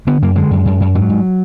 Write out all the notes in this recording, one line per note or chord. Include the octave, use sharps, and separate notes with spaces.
D3 B3
F#2 A#3
D3 G#3
F#2
F#2
F#2
G#2 F#3
G#2